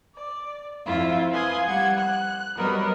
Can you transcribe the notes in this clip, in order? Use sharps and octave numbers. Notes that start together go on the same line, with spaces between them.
D5
F2 E4 F4 E5
B4 F5 G#5 C6 D#6
G3 F#5 G#6
F#6
F#3 G3 B3 A#4 B4 D#5